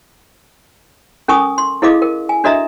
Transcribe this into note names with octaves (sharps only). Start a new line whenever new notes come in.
C#4 A4 A#4 G#5 C#6 D#6
C6
E4 G#4 A4 D#5 F5 D6
A#4
G#5
D4 F#4 A4 D#5 E5 A#5